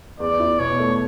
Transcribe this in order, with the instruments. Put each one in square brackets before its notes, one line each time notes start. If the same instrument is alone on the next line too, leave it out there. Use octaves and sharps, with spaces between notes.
[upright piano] E2 [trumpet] D5
[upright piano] E4
[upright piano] B2 [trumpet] C#5
[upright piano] A3